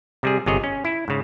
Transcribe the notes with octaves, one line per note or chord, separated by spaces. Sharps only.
C3 G3 G#4
G1 C3 G#4 C#5 D#5
C#4
E4
G#2 C#3